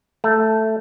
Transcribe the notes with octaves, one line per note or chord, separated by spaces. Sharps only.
A3